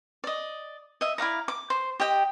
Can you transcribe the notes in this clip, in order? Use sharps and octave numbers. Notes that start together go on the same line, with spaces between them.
D5 D#5
D#5 E5
E4 D5 F5 A#5
D6
C5
G4 D#5 G5